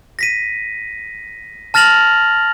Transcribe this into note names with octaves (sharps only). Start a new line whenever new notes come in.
A#6 B6 D#7
A5 F6 A6 A#6 F7 F#7